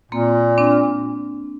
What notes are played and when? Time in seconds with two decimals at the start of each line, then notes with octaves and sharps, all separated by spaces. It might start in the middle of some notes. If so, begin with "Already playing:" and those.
0.12 A#2 A#3 C4
0.58 C4 D4